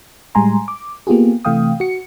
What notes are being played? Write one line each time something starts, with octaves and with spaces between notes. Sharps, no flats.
A2 G3 G#3 G#5 A#5 C6
D6
A#3 B3 F4 G4 G#4
C3 E3 A3 F5 G5 D#6
F#4 C#7